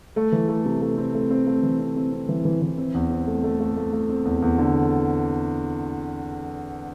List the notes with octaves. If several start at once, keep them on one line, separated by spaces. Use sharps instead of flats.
A3
E3
A3
C3
A3
C4
A3
C4
A3
E3
C4
C4
C4
E3
E3
E3
C4
E2
C4
A3
A3
A3
A3
A3
C4
E2
E2
D3